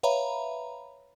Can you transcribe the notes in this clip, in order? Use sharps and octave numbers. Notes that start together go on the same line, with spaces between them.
B4 C#5 E5 F5 A#5 B5